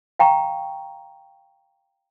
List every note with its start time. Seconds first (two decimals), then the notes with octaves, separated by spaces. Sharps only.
0.19 F5 G5 A#5 C#6